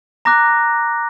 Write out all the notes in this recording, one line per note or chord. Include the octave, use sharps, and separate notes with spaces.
A#5 D6 F#6 A#6